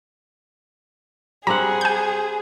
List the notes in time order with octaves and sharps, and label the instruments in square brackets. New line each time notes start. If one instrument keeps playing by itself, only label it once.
[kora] G3 C4 F#5 [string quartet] G#4 [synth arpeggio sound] A#5
[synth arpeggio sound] G#5 G6